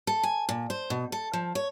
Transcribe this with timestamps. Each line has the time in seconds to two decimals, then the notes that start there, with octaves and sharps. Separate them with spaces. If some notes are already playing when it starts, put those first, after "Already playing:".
0.07 A4
0.23 G#5
0.49 A#2
0.70 C5
0.90 B2
1.12 A4
1.33 F3
1.55 C#5